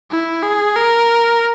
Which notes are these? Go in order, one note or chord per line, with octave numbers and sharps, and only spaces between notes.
E4
G#4
A#4